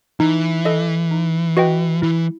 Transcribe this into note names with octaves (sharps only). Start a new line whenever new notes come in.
E3 D#4
A4 D#5
D#4
F#4 B4 D#5 G5
E3 E4